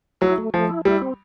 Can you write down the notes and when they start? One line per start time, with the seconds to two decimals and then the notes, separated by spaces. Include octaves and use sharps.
0.21 F#3 E4
0.38 A3
0.54 F3 A3
0.69 E4
0.85 G3 E4
1.02 C4